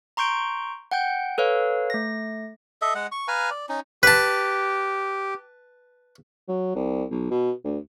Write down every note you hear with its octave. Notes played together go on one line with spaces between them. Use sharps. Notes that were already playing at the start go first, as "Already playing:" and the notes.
A#5 C6 C#6 G6 D7
F#5 G5 G6
A4 B4 C#5 F5
A3 A#6
A4 D#5 E5
G#3 F#5
C#6
B4 F5 G#5 A#5
D5
C#4 D#4
G4 B4 A5
F#3
C2
B1
B2
D2